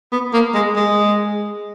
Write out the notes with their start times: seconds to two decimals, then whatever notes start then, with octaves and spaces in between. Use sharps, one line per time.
0.12 B3
0.33 A#3
0.54 G#3
0.76 G#3